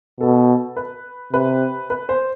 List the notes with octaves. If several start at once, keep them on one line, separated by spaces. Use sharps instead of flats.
B2 A4
B4
C3 B4
B4
C5